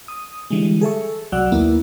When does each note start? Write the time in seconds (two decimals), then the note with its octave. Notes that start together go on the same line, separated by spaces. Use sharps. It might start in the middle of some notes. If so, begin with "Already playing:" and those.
0.08 D#6
0.50 D3 E3 G3 G#3
0.81 G#4 A4 E5 C#6
1.32 C2 F#3 D5 F#5 E6 F#6
1.52 D#2 A#3 B3 E4